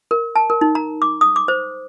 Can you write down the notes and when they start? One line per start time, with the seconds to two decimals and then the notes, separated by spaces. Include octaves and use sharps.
0.11 A#4
0.36 A5
0.50 A#4
0.61 D#4
0.75 A#5
1.02 D6
1.21 D#6
1.36 D6
1.48 C5